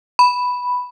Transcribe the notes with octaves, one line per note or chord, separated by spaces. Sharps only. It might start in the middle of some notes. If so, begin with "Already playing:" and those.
B5